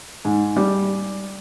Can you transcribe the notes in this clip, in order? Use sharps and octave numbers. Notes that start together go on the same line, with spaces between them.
G#2
G3